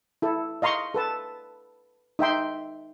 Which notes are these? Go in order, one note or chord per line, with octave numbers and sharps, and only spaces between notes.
E4 A4
D#5 F5 A#5 C6 C#6
A4 B4 A5
D#4 E5 G5 C6